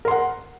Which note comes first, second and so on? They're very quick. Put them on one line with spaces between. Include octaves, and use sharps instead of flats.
A#4 C6 F#5